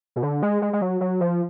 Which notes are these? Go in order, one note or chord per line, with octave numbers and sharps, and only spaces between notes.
B2
D3
G#3
G#3
G#3
F#3
F#3
F3